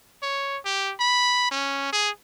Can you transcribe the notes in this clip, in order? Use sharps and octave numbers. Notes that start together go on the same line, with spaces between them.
C#5
G4
B5
C#4
G#4